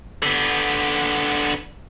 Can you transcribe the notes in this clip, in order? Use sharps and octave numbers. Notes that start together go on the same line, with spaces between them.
D3 B3